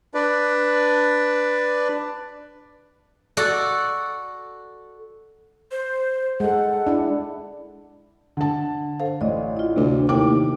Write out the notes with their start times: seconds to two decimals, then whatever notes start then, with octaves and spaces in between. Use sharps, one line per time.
0.14 D4 B4 D5
3.37 F#4 A4 D5
5.71 C5
6.40 G#3 A4 F#5
6.87 D4 E4
8.37 D3 A5
9.00 A4 C5 F5
9.21 A1 D5 D#5
9.57 E4 F4
9.76 D2 C3 D4
10.09 D#2 A3 E4 G5 D6